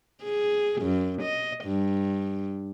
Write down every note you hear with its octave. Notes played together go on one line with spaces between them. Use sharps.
G#4
F#2
D#5
G2